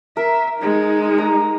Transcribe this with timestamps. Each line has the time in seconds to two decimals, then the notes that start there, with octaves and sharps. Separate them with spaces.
0.17 A#4 E5
0.59 G#3 D#4
1.18 A#5